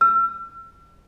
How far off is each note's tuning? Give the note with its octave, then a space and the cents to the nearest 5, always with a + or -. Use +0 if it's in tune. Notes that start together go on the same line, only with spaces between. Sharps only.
E6 +40